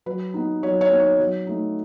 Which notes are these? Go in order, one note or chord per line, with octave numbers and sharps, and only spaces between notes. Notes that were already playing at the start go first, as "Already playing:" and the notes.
F#3 B4
B3 D#4
F#3 C#5
C#5
B3 D#4
C#5
F#3
A3 D#4